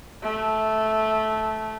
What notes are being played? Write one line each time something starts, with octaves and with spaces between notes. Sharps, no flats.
A3